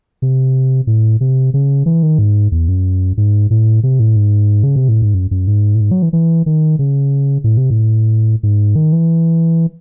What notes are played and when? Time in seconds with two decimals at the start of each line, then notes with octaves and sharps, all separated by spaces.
0.22 C3
0.87 A2
1.21 C3
1.54 C#3
1.86 E3
2.03 D#3
2.19 G#2
2.52 E2
2.68 F#2
3.17 G#2
3.51 A2
3.83 C3
4.00 A2
4.16 G#2
4.63 C#3
4.76 C3
4.89 A2
5.02 G#2
5.14 F#2
5.31 F#2
5.47 G#2
5.75 A2
5.81 G#2
5.91 F#3
6.02 E3
6.13 E3
6.46 D#3
6.79 C#3
7.44 A2
7.57 C3
7.70 A2
8.43 G#2
8.76 D#3
8.92 E3